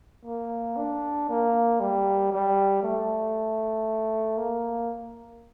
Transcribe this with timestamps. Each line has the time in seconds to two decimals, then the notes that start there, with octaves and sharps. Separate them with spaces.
0.25 A#3
0.76 D4
1.29 A#3
1.80 G3
2.32 G3
2.83 A3
4.38 A#3